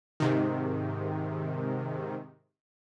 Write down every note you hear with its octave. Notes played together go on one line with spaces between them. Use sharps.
G#2 C3 D#3